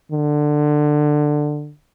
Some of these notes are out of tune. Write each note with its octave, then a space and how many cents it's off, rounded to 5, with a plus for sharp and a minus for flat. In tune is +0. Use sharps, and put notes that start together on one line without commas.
D3 +15